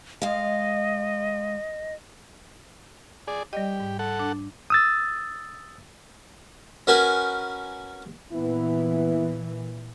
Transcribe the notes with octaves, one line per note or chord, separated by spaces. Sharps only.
G#3 D#5 F5
G#4 D5
G3 G4 D5 D#5
G#2
A4 F#5
D4
D#6 E6 A6
C#4 F#4 A#4 B4 G#5
A#2 E3 B3 E4